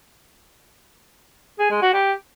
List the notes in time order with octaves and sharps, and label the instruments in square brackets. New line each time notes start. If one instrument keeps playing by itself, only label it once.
[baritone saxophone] G#4
G#3
F#4
G4